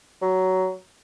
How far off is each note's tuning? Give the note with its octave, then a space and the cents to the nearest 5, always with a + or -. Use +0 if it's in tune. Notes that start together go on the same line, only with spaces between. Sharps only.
F#3 +15